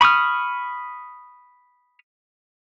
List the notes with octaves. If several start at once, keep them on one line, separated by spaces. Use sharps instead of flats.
B5 C#6 D#6 F6